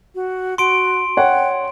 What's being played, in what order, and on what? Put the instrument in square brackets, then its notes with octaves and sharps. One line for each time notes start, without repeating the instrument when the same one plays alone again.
[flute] F#4
[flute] F#4 [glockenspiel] C6 D7
[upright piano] C#5 F#5 [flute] G5